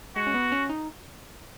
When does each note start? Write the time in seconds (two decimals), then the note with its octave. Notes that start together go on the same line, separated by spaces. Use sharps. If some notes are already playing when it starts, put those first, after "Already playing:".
0.16 G#3 F#4
0.27 C#4
0.34 B3
0.52 C#4
0.69 D#4